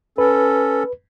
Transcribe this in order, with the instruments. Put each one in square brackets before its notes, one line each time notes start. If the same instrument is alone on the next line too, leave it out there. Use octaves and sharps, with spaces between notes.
[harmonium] C#4 A4 [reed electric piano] B4